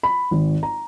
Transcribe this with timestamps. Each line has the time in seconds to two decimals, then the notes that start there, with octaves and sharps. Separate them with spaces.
0.03 B5
0.31 G#1
0.63 A#5